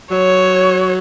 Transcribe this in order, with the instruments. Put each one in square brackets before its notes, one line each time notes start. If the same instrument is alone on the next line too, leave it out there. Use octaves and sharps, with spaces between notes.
[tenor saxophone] F#3 [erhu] C#5